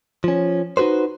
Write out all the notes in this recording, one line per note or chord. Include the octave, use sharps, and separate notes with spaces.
F3 C#4
D#4 F#4 G#4 B4 C5